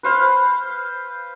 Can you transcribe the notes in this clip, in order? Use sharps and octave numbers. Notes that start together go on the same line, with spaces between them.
B4 C5 F5